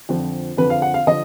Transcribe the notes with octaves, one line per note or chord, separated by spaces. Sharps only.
F2 D3 F3
F2 D3 F3 B4
F5
F#5
F5
D3 F3 D#5